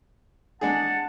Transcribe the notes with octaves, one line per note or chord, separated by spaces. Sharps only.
G#3 D4 G#4 F#5 A5